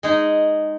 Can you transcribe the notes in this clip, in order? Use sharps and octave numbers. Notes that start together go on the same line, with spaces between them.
G#3 D#4 G#4